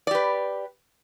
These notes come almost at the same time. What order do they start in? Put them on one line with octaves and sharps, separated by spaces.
D5 G4 B4